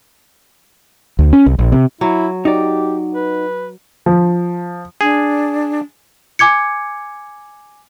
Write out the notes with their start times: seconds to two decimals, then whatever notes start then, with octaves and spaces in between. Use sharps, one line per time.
1.19 D2
1.33 C#4
1.46 C2
1.59 A#1
1.72 C3
2.01 F#3 E4
2.45 D#4 F#4 G4 D5
3.14 B4
4.06 F3
5.01 D4 G#4
6.39 G#5 D6 G#6 C#7